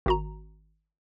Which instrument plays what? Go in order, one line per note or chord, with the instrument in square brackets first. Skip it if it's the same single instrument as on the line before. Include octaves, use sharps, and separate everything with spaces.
[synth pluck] G#1 F#4 A#5